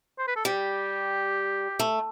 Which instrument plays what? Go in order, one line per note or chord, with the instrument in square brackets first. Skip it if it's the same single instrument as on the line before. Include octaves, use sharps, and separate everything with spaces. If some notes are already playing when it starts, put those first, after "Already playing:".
[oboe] C5
B4
A4
[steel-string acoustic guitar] G3 [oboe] G4
[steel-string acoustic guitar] A3